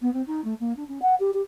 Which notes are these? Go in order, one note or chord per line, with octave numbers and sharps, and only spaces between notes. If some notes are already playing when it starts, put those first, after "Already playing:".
B3
C4
D#4
A3
A#3
D4
C#4
F#5
G4
G4